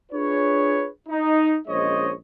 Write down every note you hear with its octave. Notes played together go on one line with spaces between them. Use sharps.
D4 F4 G#4 B4 C#5
D#4
A#1 G#3 C#4 C5 C#5 D#5